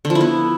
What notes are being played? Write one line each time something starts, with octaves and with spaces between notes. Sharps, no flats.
D3
F3
E4
B3